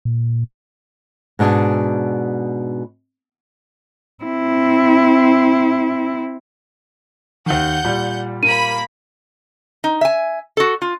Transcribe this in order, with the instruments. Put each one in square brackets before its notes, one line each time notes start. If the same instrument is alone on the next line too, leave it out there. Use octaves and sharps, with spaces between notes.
[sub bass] A#2
[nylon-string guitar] G#2 B2 D4 G#4
[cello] C4 E4
[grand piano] D#2 D#3 [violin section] F#5 G6
[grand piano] A#2 G3
[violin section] A#3 B5 [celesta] D#7
[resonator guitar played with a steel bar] D#4
E5 G#5
F#4 A4
F4